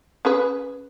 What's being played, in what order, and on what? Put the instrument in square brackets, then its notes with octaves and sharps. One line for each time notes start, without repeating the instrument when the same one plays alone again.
[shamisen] C#4 G#4 B4